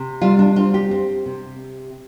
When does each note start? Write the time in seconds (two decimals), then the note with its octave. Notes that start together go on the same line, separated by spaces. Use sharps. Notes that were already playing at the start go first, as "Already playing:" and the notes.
Already playing: C3
0.22 G3 F4
0.39 D4
0.56 C4 F4
0.74 G4
0.91 C4
1.26 C3